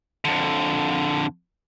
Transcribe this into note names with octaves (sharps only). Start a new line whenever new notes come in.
F2 D3